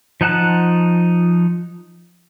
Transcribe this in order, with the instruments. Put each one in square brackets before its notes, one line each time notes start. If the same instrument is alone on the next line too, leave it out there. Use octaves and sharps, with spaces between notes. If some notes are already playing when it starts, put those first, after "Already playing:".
[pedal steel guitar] F3 D#4 F#5 A5 F#6